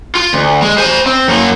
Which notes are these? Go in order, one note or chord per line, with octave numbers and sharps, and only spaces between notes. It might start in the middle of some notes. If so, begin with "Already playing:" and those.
F4
D2
G#3
C5 G#5
C4
F#2 A#3